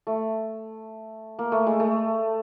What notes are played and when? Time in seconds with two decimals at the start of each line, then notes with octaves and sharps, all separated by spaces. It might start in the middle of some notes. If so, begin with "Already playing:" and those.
0.07 A3
1.39 A#3
1.52 A3
1.67 G#3
1.80 A3